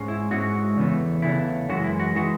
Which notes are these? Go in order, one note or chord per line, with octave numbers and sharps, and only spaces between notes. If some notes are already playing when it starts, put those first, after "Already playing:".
Already playing: G#2 G#3 C#4
E4
G#2 G#3 C#4 E4 F#4
E2 C#3 E3 A3
E2 C#3 E3 A3 E4
F#2 E3 G#3 F#4
E4
F#4
E3 G#3 F#4